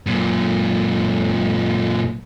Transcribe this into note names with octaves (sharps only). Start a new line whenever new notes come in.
F#2 A#2